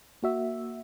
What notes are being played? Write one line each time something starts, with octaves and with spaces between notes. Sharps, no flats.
A#3 F#4 E5